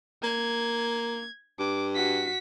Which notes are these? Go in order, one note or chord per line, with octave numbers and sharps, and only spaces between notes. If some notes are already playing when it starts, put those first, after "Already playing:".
A#3 G#6
G2 D6
F#4 B6